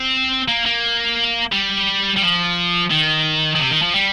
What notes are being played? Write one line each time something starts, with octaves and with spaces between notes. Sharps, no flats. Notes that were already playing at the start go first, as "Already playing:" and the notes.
Already playing: C4
A#3
A#3
G3
G3
F3
D#3
D#3
C3
D#3
F3
G3